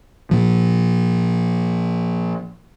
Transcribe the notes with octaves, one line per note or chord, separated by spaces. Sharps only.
A#2 F3